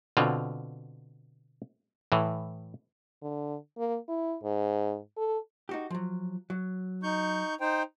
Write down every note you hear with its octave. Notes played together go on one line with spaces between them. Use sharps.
B2 D3 C4 F4
A2 E3
D3
A#3
E4
G#2
A4
D#4 F#4 G4
F3 F#3
F#3
D#4 C#6 G6
D#4 C5 G5